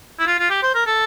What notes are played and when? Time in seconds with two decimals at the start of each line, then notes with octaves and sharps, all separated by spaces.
0.19 E4
0.27 F4
0.39 F4
0.50 G4
0.62 C5
0.74 A#4
0.86 A4